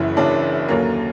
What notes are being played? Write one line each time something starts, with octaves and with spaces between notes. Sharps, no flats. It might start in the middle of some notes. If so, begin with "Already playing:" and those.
Already playing: F#1 F#2 C#3 E3 E4
F#1 F#2 C#3 E3 D4
D#2 D3 F#3 A#3 C#4